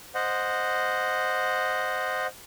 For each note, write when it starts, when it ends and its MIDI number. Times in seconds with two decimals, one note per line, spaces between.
0.15 2.27 72
0.15 2.27 75
0.15 2.27 78